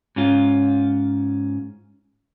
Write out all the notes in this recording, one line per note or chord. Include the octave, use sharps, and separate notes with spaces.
G#2 C#4 F4